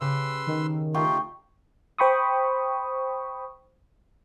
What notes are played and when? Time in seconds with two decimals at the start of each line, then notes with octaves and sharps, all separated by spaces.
0.01 C#3 G4 B4 C6 E6
0.47 D#3
0.94 A3 D#4 F4 G4 G5 C6 C#6
1.98 C5 G5 B5 C#6 D#6